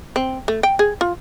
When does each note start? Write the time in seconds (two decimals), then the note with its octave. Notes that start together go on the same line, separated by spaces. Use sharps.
0.16 C4
0.48 A3
0.63 G5
0.79 G#4
1.01 F4